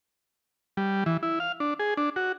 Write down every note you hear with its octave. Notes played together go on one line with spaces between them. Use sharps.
G3
E3
E4
F5
D4
G#4
D4
F#4